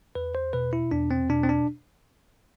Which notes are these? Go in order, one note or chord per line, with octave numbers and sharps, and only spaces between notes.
E2 B4
C5
B2 B4
E4
E2 D4
C4
B2 D4
C4
D4